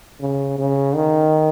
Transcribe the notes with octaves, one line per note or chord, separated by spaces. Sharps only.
C#3
C#3
D#3